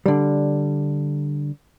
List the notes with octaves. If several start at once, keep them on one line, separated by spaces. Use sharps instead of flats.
D3 G3